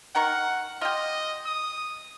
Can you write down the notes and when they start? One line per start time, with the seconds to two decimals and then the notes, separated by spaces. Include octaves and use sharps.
0.15 D#3 A#4 F#5 C#6
0.81 F4 G4 D#5
1.46 D#6